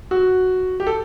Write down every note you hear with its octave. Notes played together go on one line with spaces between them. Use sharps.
F#4
G4
A4